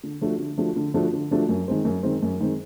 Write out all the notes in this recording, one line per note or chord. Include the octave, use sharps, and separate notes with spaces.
D3
F3 A3 D4 F#4
D3
F3 A3 D4 F#4
D3
F3 A3 D4 F#4
D3
F3 A3 D4 F#4
F#2
D#3 G#3 C4
F#2
D#3 G#3 C4
F#2
D#3 G#3 C4